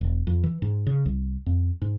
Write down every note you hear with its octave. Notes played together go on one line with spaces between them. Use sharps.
E1
F2
E3
G#2
C#3
C2
F2
G#2